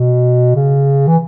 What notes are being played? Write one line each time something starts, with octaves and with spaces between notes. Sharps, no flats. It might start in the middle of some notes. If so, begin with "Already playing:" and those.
Already playing: B2
C#3
E3